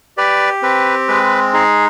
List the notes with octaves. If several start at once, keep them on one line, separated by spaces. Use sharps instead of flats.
G4 B4 D5
C4 B4
G#3 B4
D#4 G#4